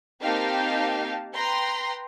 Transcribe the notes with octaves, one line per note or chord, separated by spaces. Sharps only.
A#3 C4 D#4 G4 F5 A5
B4 G5 A#5 C6